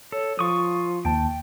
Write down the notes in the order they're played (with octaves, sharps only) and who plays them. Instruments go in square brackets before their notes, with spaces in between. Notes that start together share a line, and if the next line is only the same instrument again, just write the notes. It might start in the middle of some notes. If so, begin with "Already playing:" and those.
[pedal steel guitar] A4 [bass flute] C#5
[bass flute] F3 [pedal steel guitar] F4 C#6 D#6
[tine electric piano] D#2 A5 [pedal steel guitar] G5